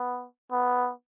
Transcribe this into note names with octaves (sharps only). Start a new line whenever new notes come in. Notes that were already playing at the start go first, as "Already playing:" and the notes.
Already playing: B3
B3